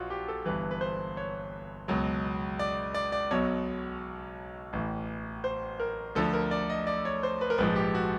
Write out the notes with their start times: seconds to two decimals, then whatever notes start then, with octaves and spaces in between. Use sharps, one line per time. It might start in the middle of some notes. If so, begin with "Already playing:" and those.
Already playing: A#1 F4 F#4
0.10 G4
0.28 A4
0.45 G1 G2 E3 B4
0.71 B4
0.81 C5
1.17 C#5
1.88 C#2 B2 F#3
2.59 D5
2.94 D5
3.12 D5
3.31 B1 B2 F#3 C#5
4.73 A1 A2 E3
5.44 C5
5.80 A#4
6.15 D2 D3 F3 A4
6.33 A#4
6.51 D5
6.70 D#5
6.87 D5
7.05 C#5
7.23 C5
7.41 B4
7.50 A#4
7.58 A#1 G#2 F3 B4
7.76 G4
7.95 F#4